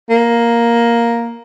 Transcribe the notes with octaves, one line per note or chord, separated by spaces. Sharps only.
A#3